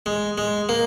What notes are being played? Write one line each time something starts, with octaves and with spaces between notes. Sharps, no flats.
G#3
G#3
A#3